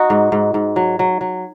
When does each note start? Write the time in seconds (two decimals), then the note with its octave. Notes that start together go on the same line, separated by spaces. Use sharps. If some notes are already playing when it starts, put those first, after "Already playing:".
Already playing: D#4 F#4
0.10 G#2
0.32 G#2
0.54 G#2
0.76 F#3
0.99 F#3
1.21 F#3